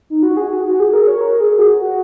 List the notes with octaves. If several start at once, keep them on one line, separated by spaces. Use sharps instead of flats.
D#4
F#4
G#4
F#4
F#4
G#4
A#4
C#5
A#4
G#4
F#4
F#4